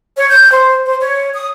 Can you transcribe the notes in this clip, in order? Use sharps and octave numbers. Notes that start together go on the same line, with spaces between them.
C#5
G6
C5
C5
C#5
D#6